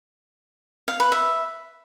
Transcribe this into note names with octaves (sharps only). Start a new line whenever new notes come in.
F5
B4
E5